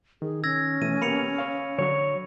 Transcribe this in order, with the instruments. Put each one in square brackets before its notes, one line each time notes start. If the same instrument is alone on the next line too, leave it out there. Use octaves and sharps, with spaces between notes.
[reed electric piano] D#3 [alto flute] G#4
[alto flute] C#4 [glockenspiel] E6 G#6 A#6
[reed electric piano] B2 E3 A3 [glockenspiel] D#7
[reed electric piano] A#3 B3 G4 [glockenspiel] B5 C#7 F7
[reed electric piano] C#5 F5
[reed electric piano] D3 F#3 C#6 [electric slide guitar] C#5